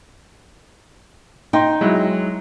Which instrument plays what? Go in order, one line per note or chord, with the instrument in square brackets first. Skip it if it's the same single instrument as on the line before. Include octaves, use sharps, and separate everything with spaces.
[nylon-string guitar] D#4 [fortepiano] G5 C6
[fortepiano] F#3 [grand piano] G#3 E4